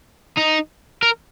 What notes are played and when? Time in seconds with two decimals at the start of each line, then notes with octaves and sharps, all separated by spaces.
0.37 D#4
1.03 A#4